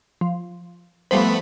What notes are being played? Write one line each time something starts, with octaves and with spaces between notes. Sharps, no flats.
F3
F3 G3 A3 B3 C5 B5